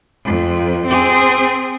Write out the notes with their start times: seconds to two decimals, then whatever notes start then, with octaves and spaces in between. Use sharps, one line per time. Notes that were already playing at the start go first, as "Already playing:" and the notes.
0.25 F2
0.87 C4 G#4